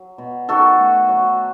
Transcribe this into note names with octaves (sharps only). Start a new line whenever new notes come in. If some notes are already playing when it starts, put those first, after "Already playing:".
Already playing: F#3
B2
D#3 F#4 A4
A3
F#3